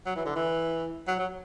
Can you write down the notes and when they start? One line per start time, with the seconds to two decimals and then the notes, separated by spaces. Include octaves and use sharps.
0.06 F#3
0.16 E3
0.25 D3
0.35 E3
1.07 F#3
1.19 F#3